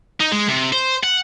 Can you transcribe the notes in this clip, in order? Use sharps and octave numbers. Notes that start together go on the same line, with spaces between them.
D#4
G#3
C3
C5
F#5